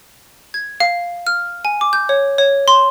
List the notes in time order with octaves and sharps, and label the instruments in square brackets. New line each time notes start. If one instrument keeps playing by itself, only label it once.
[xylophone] G#6
F5
F6
G#5
D6
G6
C#5
C#5
C6